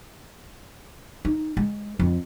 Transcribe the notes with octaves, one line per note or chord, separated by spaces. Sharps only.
D#4
G#3
F2